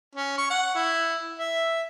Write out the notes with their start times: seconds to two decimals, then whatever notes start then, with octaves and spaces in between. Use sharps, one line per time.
0.16 C#4
0.38 C#6
0.50 F#5
0.75 E4
1.39 E5